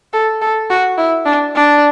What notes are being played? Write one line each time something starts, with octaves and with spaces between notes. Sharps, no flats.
A4
A4
F#4
E4
D4
D4